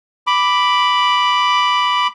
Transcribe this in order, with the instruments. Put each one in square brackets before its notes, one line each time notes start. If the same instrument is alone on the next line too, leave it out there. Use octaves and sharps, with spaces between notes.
[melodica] B5 D6